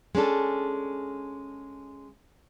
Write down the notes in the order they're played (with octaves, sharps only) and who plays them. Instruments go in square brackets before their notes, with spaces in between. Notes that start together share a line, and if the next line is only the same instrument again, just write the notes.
[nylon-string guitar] G#3 C#4 D4 A4